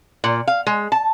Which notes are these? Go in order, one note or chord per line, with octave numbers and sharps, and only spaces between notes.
A#2
F5
G#3
A5